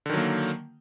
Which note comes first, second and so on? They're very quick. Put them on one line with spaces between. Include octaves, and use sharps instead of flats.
D3 D#3 F#3 A#3